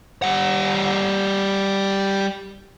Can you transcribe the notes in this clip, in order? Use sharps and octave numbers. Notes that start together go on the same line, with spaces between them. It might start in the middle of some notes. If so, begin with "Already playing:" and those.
G3 F#5